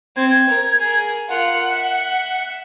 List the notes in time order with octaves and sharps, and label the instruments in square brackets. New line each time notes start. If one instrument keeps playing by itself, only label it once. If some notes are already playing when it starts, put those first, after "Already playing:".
[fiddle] C4 [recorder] G#6
[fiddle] A#4
G#4 A#4
[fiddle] F4 A#4 [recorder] F#5
[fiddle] E5